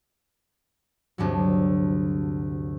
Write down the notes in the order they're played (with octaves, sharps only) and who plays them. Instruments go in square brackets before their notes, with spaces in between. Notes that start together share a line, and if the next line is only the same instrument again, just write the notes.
[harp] D2 G2 C3 F#3